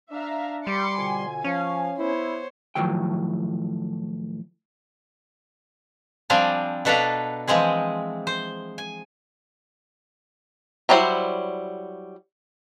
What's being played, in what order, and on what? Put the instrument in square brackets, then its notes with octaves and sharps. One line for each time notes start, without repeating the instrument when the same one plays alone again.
[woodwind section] D4 [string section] E5 F5 A#5
[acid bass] G3 [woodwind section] G4 [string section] B5 D6 C#7 [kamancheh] C6
[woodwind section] F2 B2 D3 [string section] G#5
[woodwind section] F3 [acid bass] C#4 [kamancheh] F5
[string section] B3 [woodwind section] E4 [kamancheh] C5 C#5
[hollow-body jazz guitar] A2 D#3 F3 F#3 G5
[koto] F3 G3 C4 D4 F5 G#5
B2 D4 A4 B4 F5 A#5
E3 F3 G#3 C4 G#4
C5
G#5
[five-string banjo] F#3 G3 D4 E4 C5